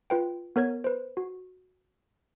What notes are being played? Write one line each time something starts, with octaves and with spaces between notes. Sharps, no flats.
F4 B4 G5
B3 A#4 C#5 G#6
B4 C5
F#4